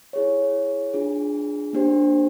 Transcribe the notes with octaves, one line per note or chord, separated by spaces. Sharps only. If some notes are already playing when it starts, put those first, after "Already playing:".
E4 G#4 C#5
D4 F4 G#4
A#3 D4 G4 C5